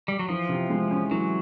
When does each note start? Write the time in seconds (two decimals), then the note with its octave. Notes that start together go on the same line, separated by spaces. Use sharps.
0.08 G3
0.19 F#3
0.29 E3 F3
0.49 C3
0.70 G#3
0.91 C#4
1.11 E3 F#3